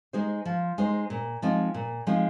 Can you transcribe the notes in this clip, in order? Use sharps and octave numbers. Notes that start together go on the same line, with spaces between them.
G#3 D#4 G#4 C5
F3
G#3 D#4 G#4 C5
A#2
F3 G#3 C4 D#4
A#2
F3 G#3 C4 D#4